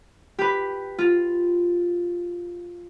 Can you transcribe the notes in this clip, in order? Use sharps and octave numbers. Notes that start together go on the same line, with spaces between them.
G4 B4
F4